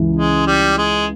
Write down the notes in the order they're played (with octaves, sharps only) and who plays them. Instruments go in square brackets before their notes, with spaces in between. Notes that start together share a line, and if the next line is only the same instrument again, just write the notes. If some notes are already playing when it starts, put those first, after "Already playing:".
Already playing: [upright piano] C#2 C#3 E3
[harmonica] G#3
G3
G#3